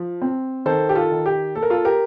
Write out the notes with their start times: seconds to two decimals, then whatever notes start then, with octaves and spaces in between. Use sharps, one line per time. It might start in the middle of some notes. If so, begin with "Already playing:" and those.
Already playing: F3
0.22 C4
0.66 D#3 A4 C5
0.89 G4
0.95 F4 A4
1.11 D#3
1.26 G4
1.55 A#3 A4
1.63 A#4
1.70 F4 A4
1.85 G4 A#4